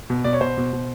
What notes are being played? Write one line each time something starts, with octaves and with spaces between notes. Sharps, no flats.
B2
B2 D5
C#5
B2 C5
B2
B2